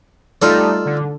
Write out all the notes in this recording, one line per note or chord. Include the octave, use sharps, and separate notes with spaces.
G3 A3 D#4 F4 A4 D5
D3